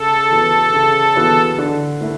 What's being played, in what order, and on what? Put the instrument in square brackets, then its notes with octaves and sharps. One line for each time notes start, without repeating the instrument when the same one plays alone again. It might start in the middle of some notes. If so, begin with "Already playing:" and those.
Already playing: [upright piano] C#3 [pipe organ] A4
[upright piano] E3 B3 F#4 B4
C#3
E3 B3 F#4 B4
D3
A3 E4 A4